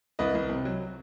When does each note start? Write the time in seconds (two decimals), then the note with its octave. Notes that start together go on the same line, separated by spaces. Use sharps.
0.19 C2 B4 D#5
0.35 C2
0.50 C3
0.65 F#3